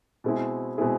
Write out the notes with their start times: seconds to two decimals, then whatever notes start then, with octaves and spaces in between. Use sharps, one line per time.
0.24 B2 G#3 C4 E4 G#4
0.78 B2 G#3 C4 E4 G#4